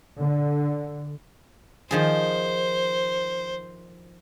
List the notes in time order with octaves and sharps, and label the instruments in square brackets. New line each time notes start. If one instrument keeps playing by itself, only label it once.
[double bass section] D3
[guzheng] D#3 F3 G#4 [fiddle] C5